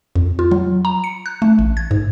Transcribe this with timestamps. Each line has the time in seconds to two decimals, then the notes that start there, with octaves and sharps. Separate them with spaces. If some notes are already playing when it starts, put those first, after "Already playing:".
0.16 F2
0.39 F4
0.51 F#3
0.85 A#5
1.04 C#7
1.26 F#6
1.42 A3
1.59 A1
1.77 G#6
1.91 G#2